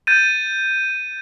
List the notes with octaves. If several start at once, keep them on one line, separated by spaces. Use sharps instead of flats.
G6 A6 D#7